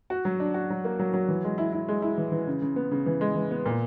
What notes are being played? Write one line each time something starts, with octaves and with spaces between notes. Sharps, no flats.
F#4
F#3
D4
F#4
F#3
A#3
F#3
F#3
E3
G#3
E4
E4
G#3
E4
E3
E3
C#3
C#3
B3
C#3
E3
G#3
E3
B3
A#2